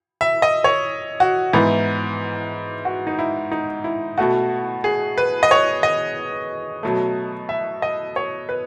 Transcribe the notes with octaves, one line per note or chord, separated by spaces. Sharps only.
E5
D#5
C#5
F#4
G#2 E3 B3 E4
F#4
D#4
E4
D#4
E4
B2 A3 F#4
G#4
B4
D#5
C#5
D#5
B2 F#3 A3
E5
D#5
C#5
B4